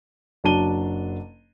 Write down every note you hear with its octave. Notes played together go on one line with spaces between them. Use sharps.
F#1 F#3 D4 A5 D#7 G7